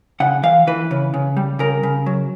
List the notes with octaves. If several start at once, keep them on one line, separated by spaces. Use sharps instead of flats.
C#3 F#5
E3 F5
E3 B4
C#3
C#3
G3
C#3 A#4
C#3
F#3